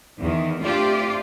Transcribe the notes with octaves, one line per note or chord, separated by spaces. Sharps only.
E2 D#3
A3 C4 D4 F4 G4 D5